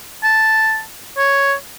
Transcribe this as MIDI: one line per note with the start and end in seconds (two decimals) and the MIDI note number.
0.24 0.81 81
1.18 1.54 73